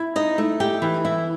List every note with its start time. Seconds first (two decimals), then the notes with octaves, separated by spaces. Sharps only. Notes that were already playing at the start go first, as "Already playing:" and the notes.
Already playing: E4
0.16 D#4 D#5
0.38 A3
0.60 G4 G5
0.82 E3
1.05 E4 E5